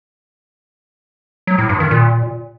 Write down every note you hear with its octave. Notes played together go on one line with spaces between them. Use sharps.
F#3
A2
G2
D#3
A#2